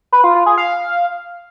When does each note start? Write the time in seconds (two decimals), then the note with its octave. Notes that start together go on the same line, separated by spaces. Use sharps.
0.12 B4
0.24 F4
0.35 F4
0.46 G#4
0.58 F5